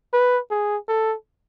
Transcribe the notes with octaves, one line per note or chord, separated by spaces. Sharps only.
B4
G#4
A4